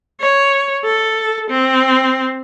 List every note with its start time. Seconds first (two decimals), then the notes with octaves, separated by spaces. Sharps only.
0.20 C#5
0.84 A4
1.50 C4